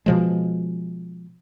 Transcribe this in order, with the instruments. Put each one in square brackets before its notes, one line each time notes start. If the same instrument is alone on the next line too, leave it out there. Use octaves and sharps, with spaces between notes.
[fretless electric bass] B2 F3 G#3